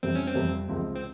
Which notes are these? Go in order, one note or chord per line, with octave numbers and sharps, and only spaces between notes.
F2 C3 G3 C4
C#4
C4
F2 C3 G3
C#2 C3 F3 C4
C4